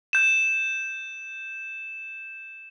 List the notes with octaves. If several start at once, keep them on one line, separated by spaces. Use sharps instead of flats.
G6 E7